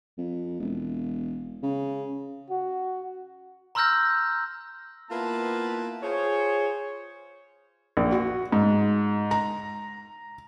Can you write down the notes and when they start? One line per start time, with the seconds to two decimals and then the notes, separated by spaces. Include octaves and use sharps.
0.18 F2
0.60 E1
1.63 C#3
2.50 F#4
3.75 A#5 C6 E6 F6 G6 A#6
5.10 A#3 B3 E4 F4 B4 A5
6.03 F4 G#4 C5 C#5
7.97 A#1
8.12 F#4
8.52 G#2
9.31 A#5